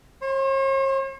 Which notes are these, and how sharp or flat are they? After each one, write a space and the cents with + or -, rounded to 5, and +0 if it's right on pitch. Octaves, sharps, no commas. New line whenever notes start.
C#5 -45 C6 +0